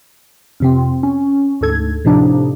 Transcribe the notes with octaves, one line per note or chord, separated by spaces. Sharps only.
F2 C3 C4
C#4
D2 G#2 A4 G#6
A2 C3 F3 D4 D#4